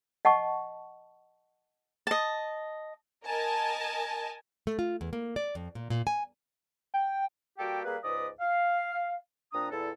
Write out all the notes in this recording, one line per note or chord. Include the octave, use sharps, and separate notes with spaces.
D#5 F#5 A5 C#6
D#5 A5
A#4 D#5 G#5 A5
A3
F4
E2
A#3
D5
F2
A#2
A#2
G#5
G5
G3 A#3 F#4 G4 A4 G5
G3 A#3 G#4 B4
C#2 G#2 B4 D5 D#5 D#6
F5
A#2 C4 D4 A#5 D#6
E2 A#2 E4 A4